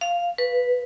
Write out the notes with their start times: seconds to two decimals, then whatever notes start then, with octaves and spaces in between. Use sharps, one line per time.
0.01 F5
0.38 B4